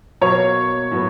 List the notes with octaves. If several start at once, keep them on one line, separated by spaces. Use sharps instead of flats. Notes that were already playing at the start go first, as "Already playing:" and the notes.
B2 F#3 A#3 C#5
A2 F#3 B3